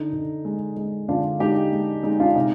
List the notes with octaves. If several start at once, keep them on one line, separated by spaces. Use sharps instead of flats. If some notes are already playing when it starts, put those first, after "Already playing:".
Already playing: D3 D#4
D3
G#3
G#3
D3 D4 F4
G#3 D#4 G4
G#3
G#3 D#4
D4 F4
C3 D#4